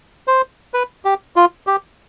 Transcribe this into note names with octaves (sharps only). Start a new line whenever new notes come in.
C5
B4
G4
F4
G4